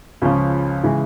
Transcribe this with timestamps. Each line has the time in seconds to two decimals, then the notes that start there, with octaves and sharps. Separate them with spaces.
0.22 C#2 C#3 F3 C#4
0.83 C#3 E3 G#3